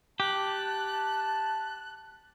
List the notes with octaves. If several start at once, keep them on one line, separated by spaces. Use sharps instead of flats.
G4 A5 F#6